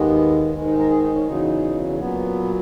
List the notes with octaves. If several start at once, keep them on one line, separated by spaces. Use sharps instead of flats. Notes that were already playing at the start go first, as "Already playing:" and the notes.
Already playing: D#2 D#3 G#3 B3
G#2 D#3 G#3
D#4
A#4
G#4
D#4
C#4
E2 C#3 F#3 D#4
A#2 F#3 B3